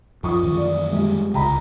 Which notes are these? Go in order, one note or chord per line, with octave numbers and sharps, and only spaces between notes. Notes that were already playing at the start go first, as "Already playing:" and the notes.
F#2 F3 C#6 D#6
F#2 D#3 E3
D5
G3 G#3
C2 C#3 G5 A#5 B5